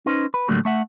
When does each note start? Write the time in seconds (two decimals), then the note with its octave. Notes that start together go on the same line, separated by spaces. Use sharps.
0.06 C#4 D#4 B4 C5
0.34 B4
0.48 A2 D3 F#3 G3 A3 A#3
0.65 A3 E5 F#5